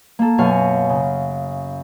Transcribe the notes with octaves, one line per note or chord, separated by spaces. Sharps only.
A#3 A4
F#2 B2 C#5 F5 G#5
C#3